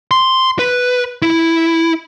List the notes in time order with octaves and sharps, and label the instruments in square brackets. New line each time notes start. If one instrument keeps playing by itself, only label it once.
[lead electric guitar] C6
B4
E4